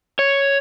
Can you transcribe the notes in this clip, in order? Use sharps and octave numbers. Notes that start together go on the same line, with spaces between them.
C#5